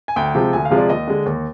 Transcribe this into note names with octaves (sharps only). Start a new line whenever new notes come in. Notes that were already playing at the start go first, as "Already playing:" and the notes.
G#5
D2 G5
C3 F3 G#3
D2 G#5
F5
C3 F3 G#3
D5
D#2 D#5
D3 G#3
D#2